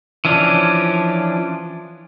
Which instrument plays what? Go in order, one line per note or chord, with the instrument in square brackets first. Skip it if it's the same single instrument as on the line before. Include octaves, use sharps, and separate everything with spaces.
[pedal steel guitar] E3 F3 C#4 D4